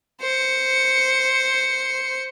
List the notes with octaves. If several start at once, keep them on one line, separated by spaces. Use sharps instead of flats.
C5 C#7